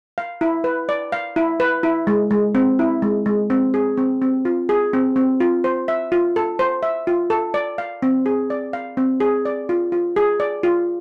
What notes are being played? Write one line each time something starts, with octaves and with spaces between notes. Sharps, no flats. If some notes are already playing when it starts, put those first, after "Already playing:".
F5
E4
B4
D5
F5
E4
B4
E4
G#3
G#3
C4
E4
G#3
G#3
C4
G#4
C4
C4
F4
G#4
C4
C4
F4
C5
E5
F4
A4
C5
E5
F4
A4
D5
F5
C4
G#4
D5
F5
C4
G#4
D5
F4
F4
G#4
D5
F4